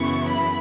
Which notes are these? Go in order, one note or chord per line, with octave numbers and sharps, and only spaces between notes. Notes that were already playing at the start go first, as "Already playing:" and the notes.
Already playing: F#2 C#3 E3 B3 E4 C#6
B5